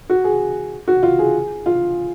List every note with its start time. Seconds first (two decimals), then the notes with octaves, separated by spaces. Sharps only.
0.09 F#4
0.24 G#4
0.88 F#4
1.03 F4
1.19 G#4
1.66 F4